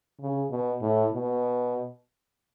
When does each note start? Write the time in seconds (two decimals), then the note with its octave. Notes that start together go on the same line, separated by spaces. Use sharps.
0.20 C#3
0.51 B2
0.82 A2
1.12 B2